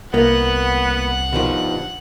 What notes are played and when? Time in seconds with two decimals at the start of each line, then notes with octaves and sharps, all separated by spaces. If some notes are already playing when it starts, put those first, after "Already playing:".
0.14 C2 A#3 B3 F#5
1.33 G2 B2 D#3 F3